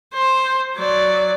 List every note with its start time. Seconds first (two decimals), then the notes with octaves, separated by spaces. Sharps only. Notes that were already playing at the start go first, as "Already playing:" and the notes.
0.14 C5
0.77 F#3 D5